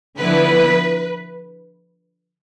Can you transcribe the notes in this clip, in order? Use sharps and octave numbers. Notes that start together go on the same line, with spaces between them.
D3 F3 B3 E4 B4